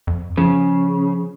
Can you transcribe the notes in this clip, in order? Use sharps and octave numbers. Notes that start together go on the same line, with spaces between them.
F2
C#3 F3